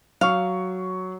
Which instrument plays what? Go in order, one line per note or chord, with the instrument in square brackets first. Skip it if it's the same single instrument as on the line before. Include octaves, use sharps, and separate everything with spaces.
[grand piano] F#3 C#6 [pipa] F5